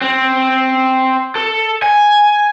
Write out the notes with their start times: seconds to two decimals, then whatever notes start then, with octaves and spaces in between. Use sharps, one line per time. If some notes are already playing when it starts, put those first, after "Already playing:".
0.02 C4
1.35 A4
1.82 G#5